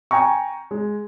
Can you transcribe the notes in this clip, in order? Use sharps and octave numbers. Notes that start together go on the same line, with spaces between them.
G5 G#5 A#5 C#6
G#3